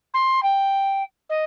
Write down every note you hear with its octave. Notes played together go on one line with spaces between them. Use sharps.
C6
G5
D#5